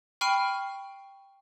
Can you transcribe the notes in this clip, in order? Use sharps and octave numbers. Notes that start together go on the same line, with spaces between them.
G5 B5 C#6 F6 C7 D#7